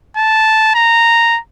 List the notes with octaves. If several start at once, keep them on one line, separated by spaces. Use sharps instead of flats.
A5
A#5